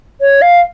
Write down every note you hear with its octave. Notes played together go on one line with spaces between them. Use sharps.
C#5
F5